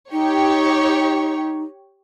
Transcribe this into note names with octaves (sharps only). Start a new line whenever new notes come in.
D#4 G4 C#5